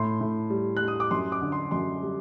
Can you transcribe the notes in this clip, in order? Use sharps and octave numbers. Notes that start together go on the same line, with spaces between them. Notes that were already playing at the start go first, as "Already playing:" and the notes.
Already playing: A2 C6
A2
G3
F#6
G3
D#6
D6
F#2 C6
D6
D3
C6
F#2 C6
G3